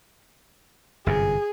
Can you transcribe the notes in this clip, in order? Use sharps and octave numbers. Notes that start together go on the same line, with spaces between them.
G1 F#2 C3 G#4